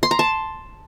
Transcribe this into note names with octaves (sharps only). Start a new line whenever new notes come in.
C6
A#5
A5